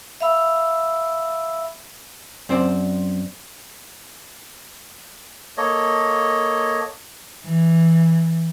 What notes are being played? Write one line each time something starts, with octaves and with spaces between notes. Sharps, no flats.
E5 F5 B5 E6
F#2 C4 C5 D5
A#3 A4 C#5 D#5
E3